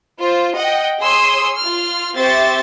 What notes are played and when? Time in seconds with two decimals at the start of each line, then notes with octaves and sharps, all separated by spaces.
0.20 F4 C5
0.56 D#5 F#5 G5
0.99 G#4 C#5 C6 D#6 E6
1.58 F4 F6
2.15 C4 G4 C5 E5 C#6 A6